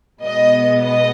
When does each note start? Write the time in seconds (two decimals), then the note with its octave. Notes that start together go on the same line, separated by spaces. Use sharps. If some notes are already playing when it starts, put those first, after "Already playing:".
0.22 B2 G#3 B3 D#5
0.81 D#5